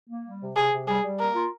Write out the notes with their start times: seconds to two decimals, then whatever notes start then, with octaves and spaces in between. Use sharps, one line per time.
0.09 A#3
0.25 G3
0.41 C3
0.56 C3 G#4
0.72 C3
0.87 G3 G#4
1.03 G3
1.19 A#3 A#4
1.35 F4